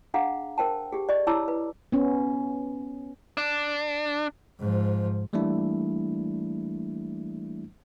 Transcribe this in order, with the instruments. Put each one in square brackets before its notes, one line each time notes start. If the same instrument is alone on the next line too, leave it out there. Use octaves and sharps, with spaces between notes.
[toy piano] D4 G#4 F5 F#5 A#5
A#4 C5 G5 A5
G4 G#4
D5 D#5 C#6
E4 C#5 A5 A#5 D6 E6
B4
[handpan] B3 C#4
[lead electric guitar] D4
[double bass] G#2 F3
[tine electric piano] E3 G3 A3 A#3 D4 E4